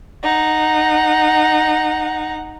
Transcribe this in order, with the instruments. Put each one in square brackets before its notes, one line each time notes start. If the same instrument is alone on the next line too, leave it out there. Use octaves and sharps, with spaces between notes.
[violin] D#4 F#5